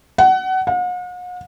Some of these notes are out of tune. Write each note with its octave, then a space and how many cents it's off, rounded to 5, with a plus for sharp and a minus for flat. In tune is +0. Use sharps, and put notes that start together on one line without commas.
F#5 +25
F#5 -45